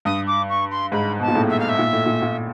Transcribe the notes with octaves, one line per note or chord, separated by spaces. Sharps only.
G2 D#6
D6
C#6
C6
G#2 B5
B2 A5
A#2
A2
E5
F5
E5
A#2
A2
A#2
A#2